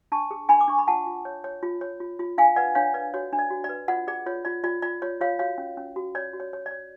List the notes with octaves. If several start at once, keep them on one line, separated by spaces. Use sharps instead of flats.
D4 A5 C#6
G#4
D4 G#5 B5
D6
D4 C#6
B5
F4 F#5 A5
F4
C#5
C#5
F4
C#5
F4
F4
D4 F5 G#5
B4 D5 F#5
D4 C#5 F5
B4 D5
F#4 C#5
D4
D5
F#4
D5
B4
F4 D5 F#5
G#4 D5
F4 C#5
F4 D5
F4 D5
F4 D5
F4 C#5
F4 C#5 F5
F#4 C#5 F5
C#4
C#4
F#4
C#5 D5
F#4
C#5
C#5
D5
C#5